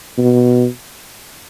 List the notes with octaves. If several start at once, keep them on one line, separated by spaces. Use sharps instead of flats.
B2